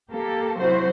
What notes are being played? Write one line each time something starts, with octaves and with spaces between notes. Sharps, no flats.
A#3 G4 A4
C3 F#3 E4 F#4 C5